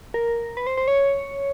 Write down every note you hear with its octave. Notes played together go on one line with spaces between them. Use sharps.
A#4
B4
C5
C5
C#5